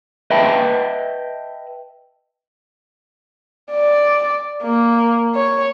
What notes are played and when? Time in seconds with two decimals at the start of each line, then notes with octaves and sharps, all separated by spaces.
0.30 B4 D#5 E5 G5 A5 B5
3.71 D5
4.63 A#3
5.35 C#5